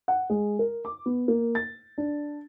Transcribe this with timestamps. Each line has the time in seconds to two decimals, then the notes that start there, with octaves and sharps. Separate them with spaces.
0.08 F#5
0.30 G#3
0.59 A#4
0.85 D6
1.06 B3
1.28 A#3
1.55 A6
1.98 D4